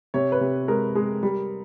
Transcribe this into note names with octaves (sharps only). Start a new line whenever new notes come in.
C3 C#5
B4
C3
G#3 A#4
G#3
G3